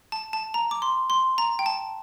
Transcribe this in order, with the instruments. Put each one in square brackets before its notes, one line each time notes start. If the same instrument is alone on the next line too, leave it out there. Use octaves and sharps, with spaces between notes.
[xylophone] A5
A5
A#5
D6
C6
C6
A#5
G5
A5